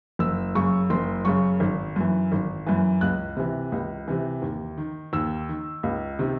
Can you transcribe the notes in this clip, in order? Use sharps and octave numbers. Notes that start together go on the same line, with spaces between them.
F#1 E6
F#2 C#3 C#6
F#1 C6
F#2 C#3 C#6
G#1
F#2 E3
G#1
F#2 E3
C#2 F#6
C3 E3
C#2
C3 E3
D#2
D#3
D#2 E6
D#3
C#2
C3 D#3